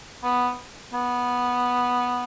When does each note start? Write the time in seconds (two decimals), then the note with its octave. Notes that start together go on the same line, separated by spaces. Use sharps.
0.24 B3
0.93 B3